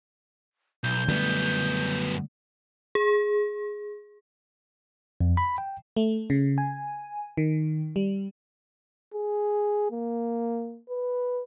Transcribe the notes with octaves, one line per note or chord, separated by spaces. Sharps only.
B1 G6
F#2 D3 G3 A3 B3
G#4
F2
B5
G5
A3
C#3
G#5
D#3
G3
G#4
A#3
B4